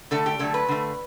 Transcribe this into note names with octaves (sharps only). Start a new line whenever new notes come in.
D3 A3 A4
G4
D3 F#3 A3 A4
B4
D3 A3